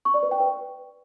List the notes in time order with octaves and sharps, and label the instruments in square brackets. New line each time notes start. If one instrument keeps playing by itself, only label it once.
[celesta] C#6
D5
B4
G5
B4